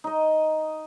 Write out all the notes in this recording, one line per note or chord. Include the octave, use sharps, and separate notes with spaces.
D#4 D#5